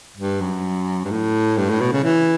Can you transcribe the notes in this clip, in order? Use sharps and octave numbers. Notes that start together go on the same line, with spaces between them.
G2
F#2
G2
A2
G2
A2
B2
C#3
E3